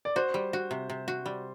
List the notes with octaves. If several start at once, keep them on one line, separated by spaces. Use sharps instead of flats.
D5
F#4 C5
G3
F#4
C3
C3
F#4
G3